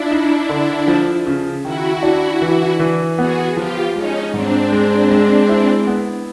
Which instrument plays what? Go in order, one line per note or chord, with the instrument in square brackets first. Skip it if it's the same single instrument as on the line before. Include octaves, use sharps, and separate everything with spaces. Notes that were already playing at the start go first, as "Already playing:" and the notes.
Already playing: [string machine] D4 E4 [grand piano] F4
[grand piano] D#4
D3
F3
C#3
[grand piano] D#3 [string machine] E4 F#4
[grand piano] D4
E3
E3
[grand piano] B3 [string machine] F#4 G#4
[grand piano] F3 [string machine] F4 G4
[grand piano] G#3 [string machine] C#4 D#4
[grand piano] G#2 [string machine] C4 D4
[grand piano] G#3
G#3
E4
B3